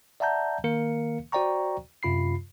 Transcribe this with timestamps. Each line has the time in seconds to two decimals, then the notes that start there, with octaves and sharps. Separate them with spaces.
0.20 D5 E5 F#5 A5 A#5 G6
0.64 D#3 A#3 A#4 F5 C#7
1.32 F#4 C5 D5 G5 A#5 C#6
2.03 F#2 C3 F4 B5 C7